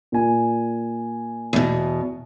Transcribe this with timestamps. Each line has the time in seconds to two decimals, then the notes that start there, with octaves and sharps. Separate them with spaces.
0.12 A#2 G#5
1.53 E2 B2